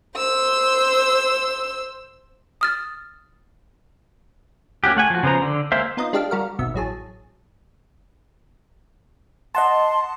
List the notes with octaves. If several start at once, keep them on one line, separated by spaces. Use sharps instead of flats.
C5 E6
D#6 F6 A6
A#3 C#4 F#4 G4
A3 F#5 G#5
F3 F#4
C#3 F3 B3 C5 A#5
D3
G#3 A#3 C5 E5 F5
B3 D#4 F4 C5 D#5
G#3 D4 F4 G4 A4 F5
G3 F#4 A#4 F5
G#1 B2 E5
A1 F#3 G#4 A5
D#5 F#5 A5 C6